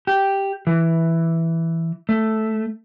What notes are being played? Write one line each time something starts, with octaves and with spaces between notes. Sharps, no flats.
G4
E3
A3